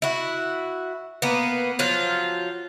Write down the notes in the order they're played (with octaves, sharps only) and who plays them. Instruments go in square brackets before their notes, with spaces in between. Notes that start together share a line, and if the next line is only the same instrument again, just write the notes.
[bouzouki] E4 F#4
A#3 B3
F3 F#3 F4